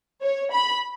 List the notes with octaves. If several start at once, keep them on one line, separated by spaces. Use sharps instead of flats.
C#5
B5